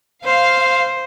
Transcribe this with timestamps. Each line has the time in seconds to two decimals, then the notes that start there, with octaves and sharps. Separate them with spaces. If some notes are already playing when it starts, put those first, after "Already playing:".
0.25 C5 F5